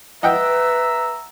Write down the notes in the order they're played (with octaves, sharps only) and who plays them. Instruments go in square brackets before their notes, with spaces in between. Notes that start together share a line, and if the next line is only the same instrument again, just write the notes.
[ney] B4 [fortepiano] D#5 F#5 G5 [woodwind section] E5 A#5 E6